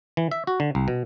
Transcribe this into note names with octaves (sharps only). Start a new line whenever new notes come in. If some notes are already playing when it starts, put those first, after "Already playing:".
E3
E5
F#4
D3
C2
B2